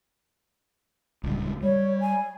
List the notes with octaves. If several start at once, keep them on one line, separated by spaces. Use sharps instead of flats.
D1 C#2 G2
G3 C#5
G#5